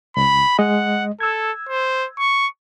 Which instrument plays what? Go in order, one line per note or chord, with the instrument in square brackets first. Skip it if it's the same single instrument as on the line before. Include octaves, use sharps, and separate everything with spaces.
[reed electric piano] C#2 [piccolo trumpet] B5
[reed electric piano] G#3 D#5 [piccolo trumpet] F#5
[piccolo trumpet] A4 [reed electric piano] E6 G#6
[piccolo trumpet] C5
C#6